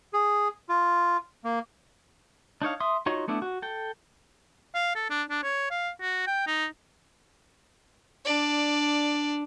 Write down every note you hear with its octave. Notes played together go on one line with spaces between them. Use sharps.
G#4
F4
A#3
D4 D#4 C#5 F5
E5 C6 D#6
D#4 F4 F#4 C#5 D#5
A3 B3 D4 E4
F#4
A4 G5
F5
A4
D4
D4
C#5
F5
F#4
G5
D#4
D4 D5